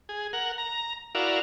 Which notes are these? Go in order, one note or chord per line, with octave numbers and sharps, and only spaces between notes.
G#4
A#4 F#5
A#5
E4 F#4 A#4 D5 F5